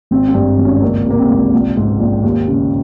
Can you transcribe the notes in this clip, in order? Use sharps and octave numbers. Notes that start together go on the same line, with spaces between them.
G#1 C4
C4
G2
G#1
C#4
C#2 A#3
C3
A#3
C4
C#2
A#1
G#2
A#1
D#2
C#3